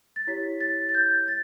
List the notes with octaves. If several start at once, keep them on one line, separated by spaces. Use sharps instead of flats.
A6
E4 G4 C#5 B6
A6
A6
G6
A6